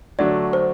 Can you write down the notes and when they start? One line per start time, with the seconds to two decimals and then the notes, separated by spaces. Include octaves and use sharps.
0.19 D3 F#3 A3 D4 F#4 D5
0.53 C5